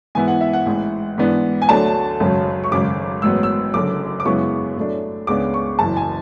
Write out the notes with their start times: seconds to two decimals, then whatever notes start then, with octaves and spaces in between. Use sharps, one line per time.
0.15 G#2 E3 B3 E4 G#5
0.28 F#5
0.41 E5
0.53 F#5
0.66 A1 G#2 E3
1.18 G#2 E3 B3 D4
1.62 G#5
1.69 D2 D3 F#3 A3 D4 A5
2.20 G#1 F#2 C#3 F#3
2.64 C#6
2.72 G#1 F#2 C#3 D6
3.22 A1 G#2 F#3 B3 E6
3.43 E6
3.74 F#1 F#2 D3 D6
4.20 D6
4.25 F#2 C#3 G#3 B3 E4 C#6
4.77 A2 F#3 A3 D4
5.27 C#2 C#3 G#3 B3 D4 D6
5.54 C#6
5.79 F#1 F#2 E3 A5
5.97 G#5